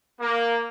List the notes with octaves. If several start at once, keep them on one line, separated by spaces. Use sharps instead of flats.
A#3